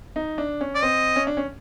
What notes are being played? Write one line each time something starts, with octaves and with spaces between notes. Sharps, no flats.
D#4
D4
C#4
D5
C4 D#5
C#4
D4
C#4